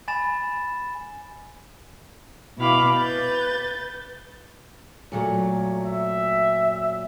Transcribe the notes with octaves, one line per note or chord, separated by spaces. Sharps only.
G#5 B5 A6 E7
B2 E4 F5 B5 D6
B4 G6 A6
A#2 F#3 A3
E5